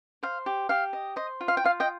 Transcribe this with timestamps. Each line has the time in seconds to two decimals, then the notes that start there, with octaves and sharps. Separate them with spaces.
0.23 C5 F5
0.46 G4
0.69 G4 F5
0.93 D#5
1.16 C5 D#5
1.41 F4
1.48 F5
1.57 G5
1.64 F4 F5
1.80 D#5 G5